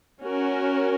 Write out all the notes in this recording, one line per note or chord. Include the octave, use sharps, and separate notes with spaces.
C#4 F#4 A#4